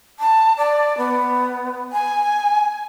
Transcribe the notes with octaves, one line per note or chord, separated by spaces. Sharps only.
A5
D5
B3
G#5